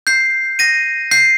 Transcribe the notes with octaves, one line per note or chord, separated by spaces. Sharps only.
G6 C7
A#6 D#7
G6 C7